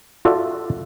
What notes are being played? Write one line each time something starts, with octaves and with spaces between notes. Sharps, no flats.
F4 F#4 A4 D5 E5